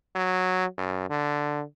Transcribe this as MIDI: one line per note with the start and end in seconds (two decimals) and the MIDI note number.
0.15 0.66 54
0.78 1.05 42
1.10 1.63 50